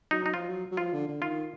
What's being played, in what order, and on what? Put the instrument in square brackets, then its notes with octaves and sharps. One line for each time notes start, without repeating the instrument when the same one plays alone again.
[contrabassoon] F#3 [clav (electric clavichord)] D#4
[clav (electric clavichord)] D#4
[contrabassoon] F3 [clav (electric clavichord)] F4
[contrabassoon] F#3
F#3
[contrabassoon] F3 [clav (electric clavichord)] F4
[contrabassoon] D3
D3
[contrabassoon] D#3 [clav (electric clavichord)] F4